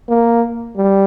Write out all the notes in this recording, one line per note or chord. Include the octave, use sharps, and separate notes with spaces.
A#3
G3